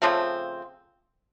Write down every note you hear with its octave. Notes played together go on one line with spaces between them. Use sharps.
C#3 F3 A3 C4